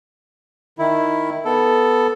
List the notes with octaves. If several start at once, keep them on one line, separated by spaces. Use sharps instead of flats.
D#3 E4
B3 A4